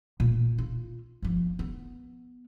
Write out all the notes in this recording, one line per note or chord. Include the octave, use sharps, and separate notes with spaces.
A#2
F4
G1 F3
B3